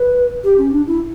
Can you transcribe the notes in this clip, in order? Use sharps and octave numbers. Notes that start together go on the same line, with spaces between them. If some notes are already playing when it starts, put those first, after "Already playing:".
Already playing: B4
G4
C#4
D4
E4